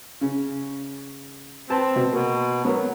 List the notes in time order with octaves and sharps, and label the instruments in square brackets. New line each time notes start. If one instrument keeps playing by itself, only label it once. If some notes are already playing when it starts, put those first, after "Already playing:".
[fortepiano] C#3 C#4
[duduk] C4 [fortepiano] B4 A5
[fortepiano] B2
[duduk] B2 [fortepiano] A#3
[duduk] F#3 [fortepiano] B3 A#4